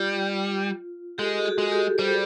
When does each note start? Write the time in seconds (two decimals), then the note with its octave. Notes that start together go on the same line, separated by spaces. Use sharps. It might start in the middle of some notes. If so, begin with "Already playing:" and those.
Already playing: G3 F4
1.18 G#3 G4 A4
1.46 F#4 G#4
1.58 G#3
1.71 G4 A4
1.98 G3 C5 D5